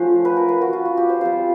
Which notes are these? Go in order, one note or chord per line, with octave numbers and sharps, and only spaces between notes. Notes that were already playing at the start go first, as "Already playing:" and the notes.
Already playing: F3 A3 C#4 C5 F#5
B4
A#4
B4
F#4
F4
F#4
G4
C5
G3 C4 F4 C5